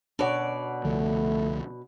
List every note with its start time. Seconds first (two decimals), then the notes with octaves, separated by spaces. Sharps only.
0.19 B2 D4 C#5 D5 F#5
0.84 C2 D3 F3 A3